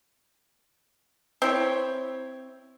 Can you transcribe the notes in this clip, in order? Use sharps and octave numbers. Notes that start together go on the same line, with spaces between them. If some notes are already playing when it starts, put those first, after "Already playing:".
C4 E4 C#5